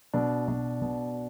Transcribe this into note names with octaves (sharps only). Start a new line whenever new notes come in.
B2 D4
B2 D4
B2